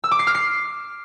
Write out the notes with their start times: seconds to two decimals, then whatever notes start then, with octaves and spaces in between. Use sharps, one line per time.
0.04 E6
0.11 D6
0.19 C7
0.27 F6
0.35 C7